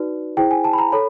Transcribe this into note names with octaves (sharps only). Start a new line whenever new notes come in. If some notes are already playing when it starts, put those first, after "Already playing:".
Already playing: D#4 F#4 B4 D5
E4 G#4 C5 G5
G#5
A5
B5
A#5
A4 C#5 B5